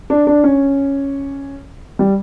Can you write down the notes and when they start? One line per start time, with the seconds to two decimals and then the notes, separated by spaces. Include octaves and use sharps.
0.10 D4
0.27 D4
0.44 C#4
1.99 G3